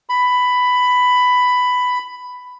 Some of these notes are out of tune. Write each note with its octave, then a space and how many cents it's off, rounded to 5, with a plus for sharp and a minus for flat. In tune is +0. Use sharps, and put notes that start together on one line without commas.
B5 +10